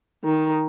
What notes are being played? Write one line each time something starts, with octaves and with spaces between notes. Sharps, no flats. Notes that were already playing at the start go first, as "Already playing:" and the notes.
D#3